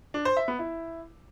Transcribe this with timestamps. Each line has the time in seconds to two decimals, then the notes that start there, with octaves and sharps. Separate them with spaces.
0.14 D4
0.25 C5
0.37 E5
0.48 B3
0.59 E4